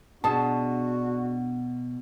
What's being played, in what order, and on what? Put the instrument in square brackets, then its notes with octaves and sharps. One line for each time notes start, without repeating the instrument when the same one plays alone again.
[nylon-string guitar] B2 [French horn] D4 [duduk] F#4 [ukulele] G#4 A5